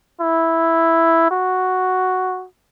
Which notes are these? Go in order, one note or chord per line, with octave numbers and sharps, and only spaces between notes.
E4
F#4